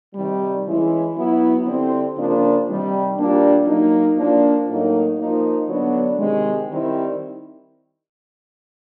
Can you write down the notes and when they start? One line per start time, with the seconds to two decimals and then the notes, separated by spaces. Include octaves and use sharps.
0.15 C3 D#3 G3
0.65 E3 G#3 C#4 E4
1.15 F#3 B3 E4
1.66 D3 G3 C4 E4
2.16 C#3 F3 A#3 D4
2.66 C3 D#3 G3
3.17 A#2 G3 A#3 D4
3.66 F#3 A#3 D#4
4.17 F3 A#3 D4
4.67 A2 F#3 A#3 D#4
5.18 F3 A#3 D#4
5.68 D3 F#3 B3 D4
6.18 C3 D#3 G#3
6.67 D#3 G3 C4 E4